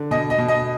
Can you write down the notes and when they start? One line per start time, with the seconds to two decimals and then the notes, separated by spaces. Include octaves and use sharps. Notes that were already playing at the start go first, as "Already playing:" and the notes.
Already playing: D3
0.11 B2 D#5
0.30 D#5
0.38 B2
0.48 D#5